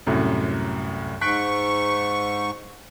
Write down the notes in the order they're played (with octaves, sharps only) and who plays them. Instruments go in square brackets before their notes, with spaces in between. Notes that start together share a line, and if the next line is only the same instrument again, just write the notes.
[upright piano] C2 F#2 A2
[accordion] G#2 C#6 [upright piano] F#6 B6 D7